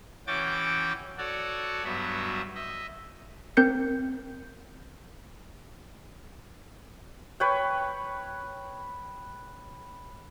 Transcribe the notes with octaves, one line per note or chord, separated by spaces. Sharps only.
E3 C#4 F#4 G5 D6 A6
F#4 A4 C#5 D5 F#5
G2 F#3 B3 F#4 E5
D#5 E5
C4 A#4 G6 C#7
B4 C#5 G5